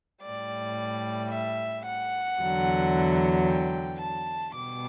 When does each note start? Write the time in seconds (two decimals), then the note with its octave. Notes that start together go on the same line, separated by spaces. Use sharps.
0.24 A2 G3 D5
1.31 E5
1.85 F#5
2.39 E2 D3 F#3
3.47 G5
4.00 A5
4.54 B2 G3 D6